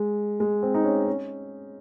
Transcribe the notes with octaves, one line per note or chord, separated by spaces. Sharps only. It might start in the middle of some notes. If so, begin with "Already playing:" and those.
Already playing: G#3
G#3
C4
D#4
C#4
C#4